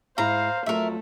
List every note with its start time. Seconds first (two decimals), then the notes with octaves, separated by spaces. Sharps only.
0.18 G#2 E4 C5 F5 A#5
0.66 F2 F#3 A3 F4 A#4 E5